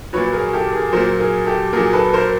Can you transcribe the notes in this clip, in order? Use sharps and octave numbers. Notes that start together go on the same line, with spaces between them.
A#2 F#3 B4 C#5
G#4 A#4
G4 A4
G#4 A#4
A#2 F#3 A#4 C5
G#4 A#4
G4 A4
A#2 F#3 G#4 A#4
A4 B4
A#4 C5